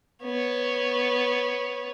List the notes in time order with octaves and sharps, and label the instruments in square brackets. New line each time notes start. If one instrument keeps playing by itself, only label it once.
[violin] B3 C#5